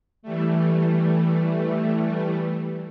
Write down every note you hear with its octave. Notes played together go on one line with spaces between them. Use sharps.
E3 G3 A3